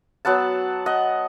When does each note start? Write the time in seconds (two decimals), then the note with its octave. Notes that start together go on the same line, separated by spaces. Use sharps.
0.25 F#3 B3 F#5 A5
0.86 D#5 F#5